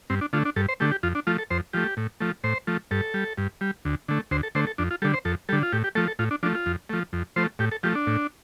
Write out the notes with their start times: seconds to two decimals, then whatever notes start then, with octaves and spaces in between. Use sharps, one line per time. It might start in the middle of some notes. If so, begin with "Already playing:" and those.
0.10 G2 C4
0.21 D4
0.33 D3 A3 F4
0.45 D4
0.56 G2 A4
0.69 C5
0.80 D3 A3 G4
0.92 G4
1.03 F2 F4
1.15 D4
1.27 F3 A3 F4
1.38 A4
1.51 F2 C5
1.73 F3 A3 G4
1.97 A2
2.20 F3 A3
2.44 A2 C5
2.67 F3 A3
2.91 G2 A4
3.14 G3
3.37 G2
3.61 G3
3.85 D2
4.08 D3 A3
4.31 D2 C5
4.43 A4
4.55 D3 A3 C5
4.67 A4
4.78 F2 D4
4.91 F4
5.02 D3 G3 A4
5.14 C5
5.25 F2 A4
5.49 D3 G3 A4
5.63 F4
5.73 A2 G4
5.84 G4
5.95 F3 A3 A4
6.08 A4
6.19 A2 F4
6.31 D4
6.43 F3 A3 D4
6.55 F4
6.66 F2
6.89 F3 A3
7.13 F2
7.36 F3 A3 C5
7.59 A2 G4
7.72 A4
7.83 F3 A3 G4
7.95 D4
8.07 A2